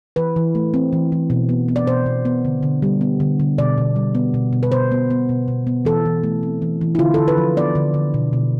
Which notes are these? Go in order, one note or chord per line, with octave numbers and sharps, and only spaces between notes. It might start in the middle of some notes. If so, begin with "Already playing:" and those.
E3 B4
E3
A3
C4
E3
E3
B2
B3
B3
D5
B2 C5
B2
B3
D3
D3
G3
B3
D3
D3
B2 D5
B2
G3
B3
B2
B2
B4
B2 C5
B3
B3
B2
B2
B3
E3 A4
E3
A3
C4
E3
E3
E4
D3 F4
D3 A4
B4
F3
B3 D5
D3
D3
B2
B2